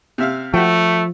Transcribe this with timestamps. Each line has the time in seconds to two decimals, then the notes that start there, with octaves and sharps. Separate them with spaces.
0.18 C3 E5 F5
0.54 F3 A3 F#4 G5